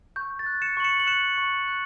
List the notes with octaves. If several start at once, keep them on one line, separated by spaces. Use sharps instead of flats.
C#6 G6
A6
F#6
C#7 E7
C#6 F#7
C#7 E7
F#7
F#6 C#7 E7
C#6
F#6